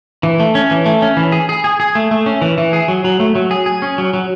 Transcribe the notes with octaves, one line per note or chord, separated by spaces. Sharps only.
E3
A3
C#4
E3
A3
C#4
E3
G#4
G#4
G#4
G#4
A3
A3
C#4
E3
E3
G#4
F#3
F#3
A3
F#3
G#4
G#4
C#4
F#3
F#3